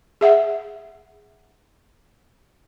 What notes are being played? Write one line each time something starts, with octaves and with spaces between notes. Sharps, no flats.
G#4 E5 F#5